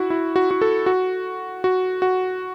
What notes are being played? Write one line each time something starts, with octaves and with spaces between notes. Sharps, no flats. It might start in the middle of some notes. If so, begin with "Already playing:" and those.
Already playing: E4 F#4
E4
F#4
F#4
A4
F#4
F#4
F#4